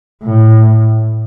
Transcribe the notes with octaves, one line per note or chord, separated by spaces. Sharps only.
A2